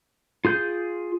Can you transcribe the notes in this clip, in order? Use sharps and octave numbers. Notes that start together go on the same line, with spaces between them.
F4 G#4 G6